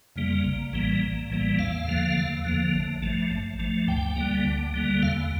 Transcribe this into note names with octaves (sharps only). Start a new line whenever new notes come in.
F2 C#3 G3 A#3
A#1
A2 E3 G3 A#3
A#1
A2 E3 G3 A#3
E2 F5
D3 F3 A#3
E2
D3 F3 A#3
A1
G2 F3 A3
A1
G2 F3 A3
D2 G5
D3 G3 A#3
D2
D3 G3 A#3
E2 F5